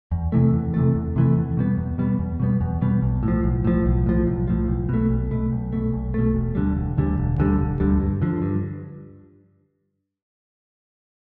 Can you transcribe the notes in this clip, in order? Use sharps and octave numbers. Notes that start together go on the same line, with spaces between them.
E2
C3 E3 A3
E2
C3 E3 A3
E2
C3 E3 A3
E2
B2 G3 B3
E2
B2 G3 B3
E2
B2 G3 B3
E2
B2 G3 B3
B1
A2
F3
B1
A2 F3
B1
A2 F3
B1
A2 F3
B1
B2 A3
B1
B2 A3
B1
B2 A3
B1
B2 A3
E1
D2 D3 G3
E1
D2 D3 G3
E1
D2 D3 G3
E1
D2 D3 G3
G2
D3 F3
G2